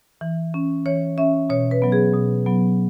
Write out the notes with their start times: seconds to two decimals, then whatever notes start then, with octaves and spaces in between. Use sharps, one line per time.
0.21 E3
0.54 C#4
0.86 E3 C#5
1.18 C#4 E5
1.49 B2 C#5
1.71 B4
1.82 F#3 B3
1.92 G#4
2.14 B2
2.46 F#3 B3